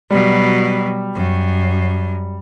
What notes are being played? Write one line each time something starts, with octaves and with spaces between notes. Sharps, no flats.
B2 F#3 G3
F#2